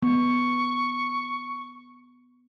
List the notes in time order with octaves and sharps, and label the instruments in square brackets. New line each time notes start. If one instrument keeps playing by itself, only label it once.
[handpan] B3 [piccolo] C#6